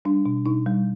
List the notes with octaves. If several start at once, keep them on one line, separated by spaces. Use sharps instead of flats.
G3 D4
B2
B2 D#4
G3